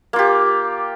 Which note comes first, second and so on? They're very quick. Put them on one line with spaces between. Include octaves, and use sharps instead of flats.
A#3 F4 G4